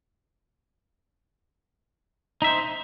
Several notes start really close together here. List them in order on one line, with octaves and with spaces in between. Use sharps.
D#4 E5 C5